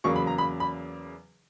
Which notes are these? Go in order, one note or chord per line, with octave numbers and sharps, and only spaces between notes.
E2 C#3 F#3 A#3 C#6
B5
A#5
B5
B5